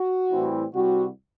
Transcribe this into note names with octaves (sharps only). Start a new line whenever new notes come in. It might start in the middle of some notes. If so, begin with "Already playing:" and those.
Already playing: F#4
A2 E3 G3 C4 E4
C2 C3 G3 C4 F#4